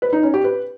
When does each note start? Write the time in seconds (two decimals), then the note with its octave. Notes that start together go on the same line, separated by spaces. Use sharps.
0.02 B4
0.13 D#4
0.23 C#4
0.34 G4
0.44 B4